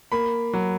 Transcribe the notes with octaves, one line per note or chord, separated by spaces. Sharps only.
A#3 B5
F#3